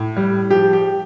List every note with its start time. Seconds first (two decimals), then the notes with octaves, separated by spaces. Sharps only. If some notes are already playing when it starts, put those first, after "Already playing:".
Already playing: A2
0.17 G3
0.50 F3 G4
0.73 G4